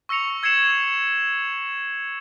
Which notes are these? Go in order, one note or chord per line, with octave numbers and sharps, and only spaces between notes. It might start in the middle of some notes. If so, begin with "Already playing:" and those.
C#6 E6 A#6 C#7 F7
E6 G#6 C7 C#7 E7 F#7